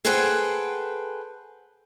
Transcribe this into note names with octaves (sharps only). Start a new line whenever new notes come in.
G#4 A4 B4 C5 F#5 G5